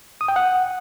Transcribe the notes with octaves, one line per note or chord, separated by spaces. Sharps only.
D#6
G5
F#5